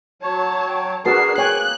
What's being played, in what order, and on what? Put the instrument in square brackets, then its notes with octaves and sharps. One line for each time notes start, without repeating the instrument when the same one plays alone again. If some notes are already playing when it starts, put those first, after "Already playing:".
[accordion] F#3 C#5 [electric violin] A5
[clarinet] G5
[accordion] D4 A#4 [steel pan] F#4 B4 A5 [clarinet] G#4 [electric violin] C7
[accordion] A#3 [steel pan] C#5 G5 G#5 [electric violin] F#6